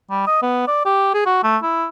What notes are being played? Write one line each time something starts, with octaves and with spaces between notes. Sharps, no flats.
G3
D#5
B3
D5
G4
G#4
F#4
A3
E4